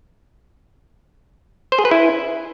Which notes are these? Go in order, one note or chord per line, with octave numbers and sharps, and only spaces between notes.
C5
G#4
B4
E4